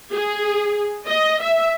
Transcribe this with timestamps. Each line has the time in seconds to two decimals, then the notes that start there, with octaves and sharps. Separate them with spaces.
0.12 G#4
1.08 D#5
1.42 E5